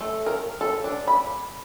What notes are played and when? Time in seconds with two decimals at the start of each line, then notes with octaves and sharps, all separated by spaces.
0.01 A3
0.26 A#4
0.61 A4
0.84 D4
1.08 B5